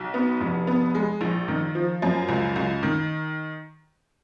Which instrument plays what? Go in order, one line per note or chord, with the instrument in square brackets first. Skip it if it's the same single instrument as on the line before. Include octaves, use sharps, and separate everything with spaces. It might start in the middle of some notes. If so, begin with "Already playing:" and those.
Already playing: [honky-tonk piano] B1
B3
F1
B3
G#3
A#1
D#3
F3
F#2
C#2
C#2
D#3